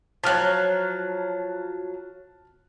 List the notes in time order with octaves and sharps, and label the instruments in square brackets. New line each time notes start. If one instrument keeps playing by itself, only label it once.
[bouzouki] F3 F#3 [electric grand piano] A5 F6 F#6